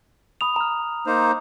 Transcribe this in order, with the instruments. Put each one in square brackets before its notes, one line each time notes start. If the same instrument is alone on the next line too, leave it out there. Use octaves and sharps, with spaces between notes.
[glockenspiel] B5 D#6 F7
A#5 F6
[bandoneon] A#3 D#4 C5